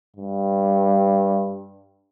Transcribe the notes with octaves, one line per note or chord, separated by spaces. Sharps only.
G2